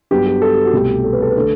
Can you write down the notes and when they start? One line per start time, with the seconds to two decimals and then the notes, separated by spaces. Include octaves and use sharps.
0.11 G2 F#3 B3 G4
0.27 G4
0.42 A4
0.54 G4
0.65 F#4
0.72 C2 B2 A3 G4
1.04 A4
1.13 B4
1.22 A4
1.31 B4
1.37 D3 A3 A4